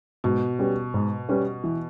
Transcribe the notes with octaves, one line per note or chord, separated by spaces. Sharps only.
G#2 B2
G3 C#4 G4 B4
G#2
G3 C#4 G4 B4
E3